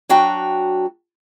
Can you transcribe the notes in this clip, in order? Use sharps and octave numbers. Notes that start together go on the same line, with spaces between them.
F#3 D4 F#4 G5 A#5